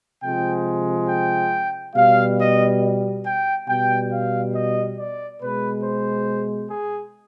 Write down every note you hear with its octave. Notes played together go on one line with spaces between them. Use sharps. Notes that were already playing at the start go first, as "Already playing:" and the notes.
C3 F3 G#3 G5
G5
B2 G3 F5
D#5
G5
B2 G3 G5
F5
D#5
D5
B2 G#3 B4
C5
G#4